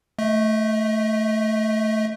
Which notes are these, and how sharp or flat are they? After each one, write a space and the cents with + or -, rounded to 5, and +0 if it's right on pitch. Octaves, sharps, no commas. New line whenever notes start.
A3 +0 D#5 +35